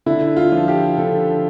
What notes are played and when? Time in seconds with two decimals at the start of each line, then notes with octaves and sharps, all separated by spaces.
0.06 D3 E4
0.37 F4
0.52 F3
0.68 G4
0.98 D3 A4